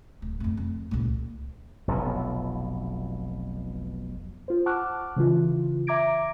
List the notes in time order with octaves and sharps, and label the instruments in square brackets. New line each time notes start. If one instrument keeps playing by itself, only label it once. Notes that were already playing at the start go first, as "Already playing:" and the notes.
[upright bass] D1
F2 A3
F2
C#2 A#2
[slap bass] F1 B1 F2 B2
[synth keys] F4 C5
F#5 A5 C#6 D6 F6 F#6
C#3 E3 F4
E5 A#5 D6 G#6 A#6 D7